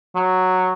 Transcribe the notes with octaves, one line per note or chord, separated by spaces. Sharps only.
F#3